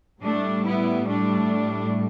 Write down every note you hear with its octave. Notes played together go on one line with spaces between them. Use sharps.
A2 G3 A3 D4
B3 E4
A3 D4